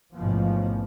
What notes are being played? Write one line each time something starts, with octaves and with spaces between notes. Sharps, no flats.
A1 G#2 B2 F3